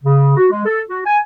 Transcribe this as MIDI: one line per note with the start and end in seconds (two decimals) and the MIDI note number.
0.03 0.36 49
0.37 0.48 66
0.51 0.64 56
0.65 0.81 69
0.89 0.99 66
1.06 1.18 80